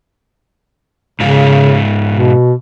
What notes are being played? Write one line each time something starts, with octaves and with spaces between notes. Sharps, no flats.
G#2 C#3 F4
B2